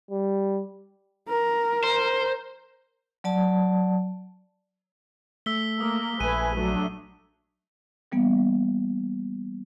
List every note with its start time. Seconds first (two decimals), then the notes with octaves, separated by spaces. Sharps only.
0.11 G3
1.29 A#4
1.83 C5
3.24 F#3 D5 A5
5.46 A3 E6 B6 G7
5.81 A#3 D#6
6.20 A#1 A3 B4 G#5 D#7
6.56 F#3 A3 D4
8.12 E3 G3 A#3 B3